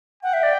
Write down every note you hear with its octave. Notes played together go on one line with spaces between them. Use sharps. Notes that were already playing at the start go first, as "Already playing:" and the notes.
F#5 G5
E5
D5